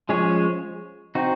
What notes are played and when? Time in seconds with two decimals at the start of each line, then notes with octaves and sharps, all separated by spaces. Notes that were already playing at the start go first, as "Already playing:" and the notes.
0.09 F3 G#3 C#4 G#4 C#5
1.15 C4 D#4 F#4